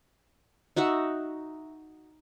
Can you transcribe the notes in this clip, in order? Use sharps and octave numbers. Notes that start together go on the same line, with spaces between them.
D#4 F#4 E5 F#5